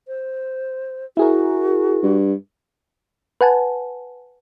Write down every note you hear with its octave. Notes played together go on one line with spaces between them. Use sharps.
C5
E4 F#4 G#4 A#4
G2
B4 F#5 G#5 A5